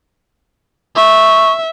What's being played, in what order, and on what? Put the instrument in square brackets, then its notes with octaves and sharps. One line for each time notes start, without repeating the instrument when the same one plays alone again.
[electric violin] E5 [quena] C#6